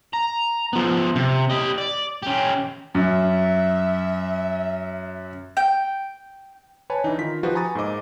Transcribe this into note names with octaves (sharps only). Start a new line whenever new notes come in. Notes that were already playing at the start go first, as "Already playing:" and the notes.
A#5
F3 B3
C3
G4 D#5
D5
C#4 G4
F#2 E5
G5
B4 C#5 G#5 A5 B5
E3 D4 D#4
D#3 F4 A#4 B6
F3 D#4 F#4 G4 B4
G#5 A#5 B5 C#6 D#6 A6
G#2 A#3 C5 D#5 D6